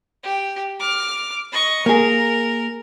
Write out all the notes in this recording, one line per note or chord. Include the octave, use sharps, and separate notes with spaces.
G4
D6 F6
D#5 C#6
A#3 G#4 A#4